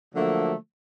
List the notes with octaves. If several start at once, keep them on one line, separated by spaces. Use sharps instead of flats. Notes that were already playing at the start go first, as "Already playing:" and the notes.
D3 F3 F#3 A3 A#3